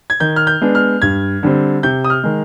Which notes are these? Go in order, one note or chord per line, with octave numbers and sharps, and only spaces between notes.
G#6
D#3 G6
F6
G6
G#3 B3 D4
F6
G2 G#6
D3 G3 C4
C3 G6
D#6
F6
D#3 G#3